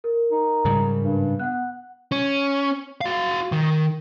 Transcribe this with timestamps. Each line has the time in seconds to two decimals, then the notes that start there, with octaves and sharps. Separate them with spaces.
0.04 A#4
0.31 D#4
0.65 G#2 C#3 G3
1.01 G2
1.39 B3 F#5 F#6
2.12 C#4
3.01 F#4 F5
3.52 D#3